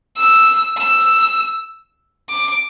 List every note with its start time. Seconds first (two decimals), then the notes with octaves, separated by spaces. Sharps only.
0.17 E6
0.77 E6
2.29 D6